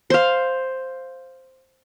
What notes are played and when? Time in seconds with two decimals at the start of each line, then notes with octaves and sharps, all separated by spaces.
0.10 C5 F5